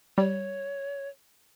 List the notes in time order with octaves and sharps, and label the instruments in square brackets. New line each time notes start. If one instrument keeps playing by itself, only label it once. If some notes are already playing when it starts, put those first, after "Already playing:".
[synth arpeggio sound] G3 [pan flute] C#5